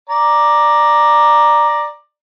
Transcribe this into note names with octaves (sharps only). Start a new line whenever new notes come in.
D5 A#5